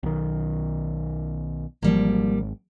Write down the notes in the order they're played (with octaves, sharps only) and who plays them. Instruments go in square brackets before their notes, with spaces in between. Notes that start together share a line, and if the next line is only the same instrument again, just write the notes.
[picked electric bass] B1 D#3
[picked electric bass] G#1 [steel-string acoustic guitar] F3 G3 A#3